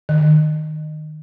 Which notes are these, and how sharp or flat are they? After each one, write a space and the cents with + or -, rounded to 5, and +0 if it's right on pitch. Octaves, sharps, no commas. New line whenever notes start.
D#3 -15